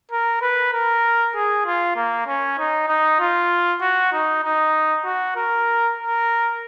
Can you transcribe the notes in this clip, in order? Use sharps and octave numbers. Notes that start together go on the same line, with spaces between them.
A#4
B4
A#4
G#4
F4
A#3
C#4
D#4
D#4
F4
F#4
D#4
D#4
F#4
A#4
A#4